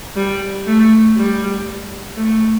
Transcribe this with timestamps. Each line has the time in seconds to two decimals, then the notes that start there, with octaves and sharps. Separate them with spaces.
0.16 G3
0.67 A3
1.16 G3
2.16 A3